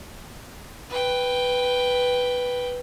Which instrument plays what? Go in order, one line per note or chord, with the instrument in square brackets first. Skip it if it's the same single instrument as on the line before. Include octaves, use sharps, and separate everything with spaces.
[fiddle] B4 G5